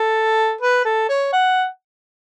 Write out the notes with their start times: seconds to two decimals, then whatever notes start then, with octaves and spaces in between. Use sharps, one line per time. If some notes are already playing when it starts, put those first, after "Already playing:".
Already playing: A4
0.61 B4
0.85 A4
1.09 C#5
1.33 F#5